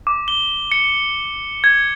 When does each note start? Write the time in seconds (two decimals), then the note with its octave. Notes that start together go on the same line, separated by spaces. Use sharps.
0.07 D6
0.28 G7
0.72 C#7
1.64 G#6